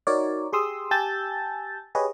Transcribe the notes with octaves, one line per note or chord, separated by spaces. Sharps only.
D#4 F#4 A#4 C#5 D5
G4 G#4 C6 D#6 E6
G4 G#5 A5 E6 G6 A6
G4 G#4 B4 C#5 D#5